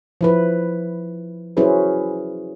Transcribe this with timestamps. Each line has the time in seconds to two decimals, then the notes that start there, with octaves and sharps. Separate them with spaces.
0.21 F3 E4 B4
1.57 F#3 C#4 E4 G#4 B4 C5